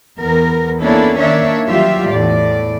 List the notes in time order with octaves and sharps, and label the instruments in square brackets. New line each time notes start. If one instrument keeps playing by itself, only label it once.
[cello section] E2 B3 A#4
A#3 B3 C#4 D4 E4 A4
D#3 A#3 D4 C#5 E5
E3 F#3 G3 F4 G4 E5
E2 A2 D5